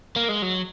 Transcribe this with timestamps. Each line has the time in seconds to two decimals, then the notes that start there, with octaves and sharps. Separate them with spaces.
0.16 A#3
0.29 G#3
0.42 F#3